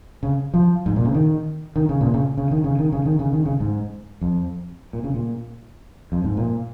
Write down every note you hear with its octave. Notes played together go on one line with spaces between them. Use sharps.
C#3
F3
G#2
A#2
C#3
D#3
D#3
C#3
A#2
C#3
C#3
D#3
C#3
D#3
C#3
D#3
C#3
D#3
C#3
G#2
F2
A#2
C#3
A#2
F2
G#2
A#2